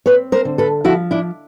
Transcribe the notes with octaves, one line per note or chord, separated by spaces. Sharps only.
C4 B4 C#5
A#4 C5
D3
A4 B4
F3 E4 F#4
D4 E4